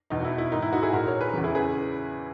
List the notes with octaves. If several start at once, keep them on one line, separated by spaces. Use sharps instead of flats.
E2 B2 D#4
F#4
E4
E4
G#2 D#3 D#4
E4
D#4 F#4
E4 G#4
A#2 F#4 A#4
A#4 C#5
G#4 B4
E2 C#3 E3
E4 G#4
G#4 B4